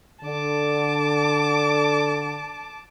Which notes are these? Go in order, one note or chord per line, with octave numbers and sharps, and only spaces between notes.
D3 A5 D6